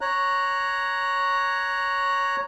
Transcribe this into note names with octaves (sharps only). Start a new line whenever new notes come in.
C#5 A#5 F#6